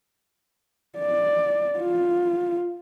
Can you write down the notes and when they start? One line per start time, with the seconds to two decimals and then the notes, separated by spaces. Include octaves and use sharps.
0.99 D5
1.79 F4